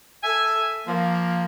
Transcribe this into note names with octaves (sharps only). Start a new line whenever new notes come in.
A4 E5 G#5
F3 A#3